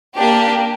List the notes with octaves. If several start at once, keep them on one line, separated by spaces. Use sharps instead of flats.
A#3 D4 G4